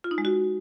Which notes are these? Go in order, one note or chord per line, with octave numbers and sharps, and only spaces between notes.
F4
D#4
G#3
F#4